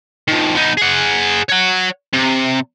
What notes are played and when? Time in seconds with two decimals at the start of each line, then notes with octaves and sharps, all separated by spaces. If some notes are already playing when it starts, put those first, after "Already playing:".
0.28 D#3 F3
0.55 B3 D#4
0.77 G#4 F#5
1.49 C#5 F#5
2.13 C3